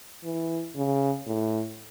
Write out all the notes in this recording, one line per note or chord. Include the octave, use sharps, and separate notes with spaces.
E3
C#3
A2